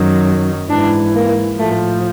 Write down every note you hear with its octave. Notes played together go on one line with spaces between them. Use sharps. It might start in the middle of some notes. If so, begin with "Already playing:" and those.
Already playing: F#2 D#3 F#3
G#2 E3 D4
A#3
A2 F3 A3